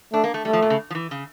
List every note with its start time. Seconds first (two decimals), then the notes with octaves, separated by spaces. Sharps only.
0.13 A3 D4
0.24 A#3
0.34 A3
0.45 G3 A3
0.53 F3
0.62 A#2
0.70 C#3
0.90 F3
0.95 E3
1.11 C#3